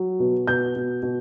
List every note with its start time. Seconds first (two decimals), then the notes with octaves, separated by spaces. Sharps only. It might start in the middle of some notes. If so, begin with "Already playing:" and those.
Already playing: F#3
0.20 B2
0.47 B2 G6
0.76 B2
1.02 B2